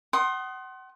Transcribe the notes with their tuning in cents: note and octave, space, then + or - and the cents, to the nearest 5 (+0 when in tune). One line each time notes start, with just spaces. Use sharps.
F#5 +35 C6 +20 D#6 +0